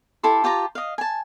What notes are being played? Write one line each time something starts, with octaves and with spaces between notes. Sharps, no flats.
E4 G4 A4 C6
F4 G4 A5 A#5
D#5 F5
G#5 A5